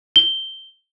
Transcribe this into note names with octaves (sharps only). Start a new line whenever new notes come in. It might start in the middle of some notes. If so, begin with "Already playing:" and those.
G7